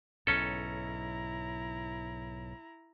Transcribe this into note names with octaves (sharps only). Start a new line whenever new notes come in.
B1 G#2 C#4 E4 A4 A#5